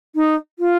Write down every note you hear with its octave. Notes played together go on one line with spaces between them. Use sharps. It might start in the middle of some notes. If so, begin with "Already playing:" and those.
D#4
F4